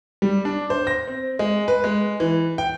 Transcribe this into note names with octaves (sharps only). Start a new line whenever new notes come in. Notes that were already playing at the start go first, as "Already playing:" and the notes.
G3
D4
C5
A#6
C4
G#3
B4
G#3
E3
G5